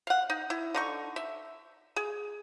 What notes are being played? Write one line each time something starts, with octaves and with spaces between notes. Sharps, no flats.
F5 F#5
D#4
E4
D3 D#4 C#6
E5
G#4